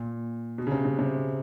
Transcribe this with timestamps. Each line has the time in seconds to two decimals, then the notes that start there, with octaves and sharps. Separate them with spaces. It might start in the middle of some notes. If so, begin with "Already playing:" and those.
Already playing: A#2
0.58 B2
0.67 C#3
0.72 C3
0.85 C3
0.99 C3